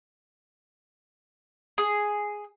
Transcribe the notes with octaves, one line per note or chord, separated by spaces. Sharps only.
G#4